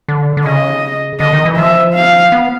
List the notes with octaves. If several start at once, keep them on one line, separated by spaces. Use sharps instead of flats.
D3
D3
C#3 D#5
D3 D#5
D#3
E3
F3 E5
F5
B3